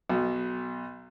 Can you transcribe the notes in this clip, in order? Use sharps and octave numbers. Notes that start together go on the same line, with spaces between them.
B1 B2